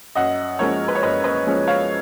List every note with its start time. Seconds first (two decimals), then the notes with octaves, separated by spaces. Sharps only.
0.15 F#2 D#5 F#5
0.59 F3 G#3 C#4 A#4 C#5
0.88 B4
0.95 C#5
1.02 F#2 B4 D#5
1.24 B4 D#5
1.47 F3 G#3 C#4
1.67 C#5 F5